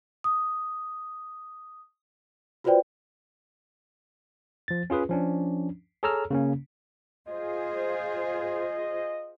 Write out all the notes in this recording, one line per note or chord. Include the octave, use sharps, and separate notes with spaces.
D#6
F4 F#4 B4 C5 D5 G5
F3 A6
C#4 F4 G#4 B4
F3 C#4 D4
G#4 A4 C#5 A#5 E6 F6
C#3 A#3 C#4
F4 G#4 C5 D#5